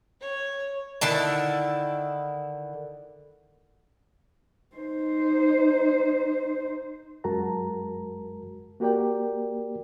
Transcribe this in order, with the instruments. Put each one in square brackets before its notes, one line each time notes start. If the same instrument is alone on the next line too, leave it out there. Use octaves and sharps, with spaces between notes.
[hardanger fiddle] C#5
[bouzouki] D3 D#3 E4 A5
[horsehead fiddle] D#4 C5
[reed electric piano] F#2 G#3 F#4 A#4 A5 A#5
A#3 F#4 G4 A#4 D5 G5